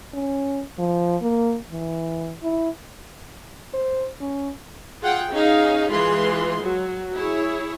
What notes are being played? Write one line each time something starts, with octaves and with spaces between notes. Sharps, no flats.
C#4
F3
A#3
E3
E4
C5
C#4
F4 G#4 F#5 G5
C#4 D#4 G#4 F5
E3 G#3 F4 G#4 B4 C6
F#3
E4 G#4 C#5